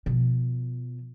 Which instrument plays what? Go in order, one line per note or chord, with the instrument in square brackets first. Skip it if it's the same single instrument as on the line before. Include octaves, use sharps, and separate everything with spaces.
[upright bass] B2 F3